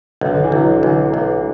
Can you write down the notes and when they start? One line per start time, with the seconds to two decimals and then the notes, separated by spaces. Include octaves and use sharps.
0.21 B1 D3
0.34 D3
0.44 E3
0.52 B1 F#3
0.76 D3
0.83 B1 E3
1.14 B1